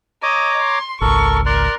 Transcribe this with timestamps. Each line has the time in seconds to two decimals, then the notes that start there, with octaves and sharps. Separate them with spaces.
0.23 C#5 D#5 A#5 D6
0.62 C6
1.01 G#1 C#2 A4 A#4 C#6
1.46 A#4 D5 C6 F#6